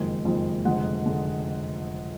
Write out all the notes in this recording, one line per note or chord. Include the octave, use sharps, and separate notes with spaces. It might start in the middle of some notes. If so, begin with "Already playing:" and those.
Already playing: F#1 F2 D#3 G#3
F#1 F2 D#3 G#3
F1 F2 D3 G#3 F#5
D3 G#3